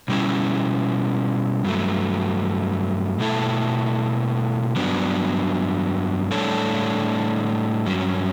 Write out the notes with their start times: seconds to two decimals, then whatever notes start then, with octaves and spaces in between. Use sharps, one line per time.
0.08 B2 G3 C#4 E4
1.64 G2 F#3 A3
3.19 B2 A3 E4 A4
4.76 G2 F#3 B3 D4
6.31 A2 G3 D4 A4 C#5
7.86 G2 F#3 C#4